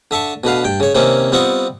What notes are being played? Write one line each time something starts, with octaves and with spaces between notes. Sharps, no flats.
D3 E5 A5 C#6
B2 D3 B4 F5
G2 G5
C#3 C#5
C3 D#3 A#3 C4 C#4
G3 B3 C4 F4 D#5 C#6